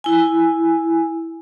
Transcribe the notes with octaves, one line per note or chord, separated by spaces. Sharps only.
E4 G#5